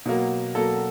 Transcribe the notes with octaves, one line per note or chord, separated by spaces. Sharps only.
B2 F#3 A#3
B2 F#3 A#3 A4